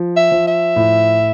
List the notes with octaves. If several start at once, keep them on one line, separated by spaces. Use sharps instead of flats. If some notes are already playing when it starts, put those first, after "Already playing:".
Already playing: F3
E5
F3
E5
A2